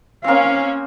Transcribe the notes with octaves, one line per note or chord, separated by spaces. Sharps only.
A#3 C4 C#4 F5